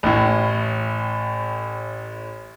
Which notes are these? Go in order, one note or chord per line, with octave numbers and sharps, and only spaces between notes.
A1 A2